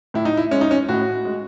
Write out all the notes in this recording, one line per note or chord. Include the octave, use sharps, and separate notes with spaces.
A2 E4
D#4
E4
G#3 C#4
D#4
C#4
A2 F#4
G#3